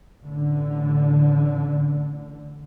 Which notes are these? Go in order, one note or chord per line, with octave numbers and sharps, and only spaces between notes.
A1 D3